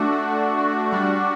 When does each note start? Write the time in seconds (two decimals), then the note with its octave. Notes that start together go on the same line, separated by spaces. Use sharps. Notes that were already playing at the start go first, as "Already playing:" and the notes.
Already playing: A3 D4 F#4
0.92 G3 D4 F#4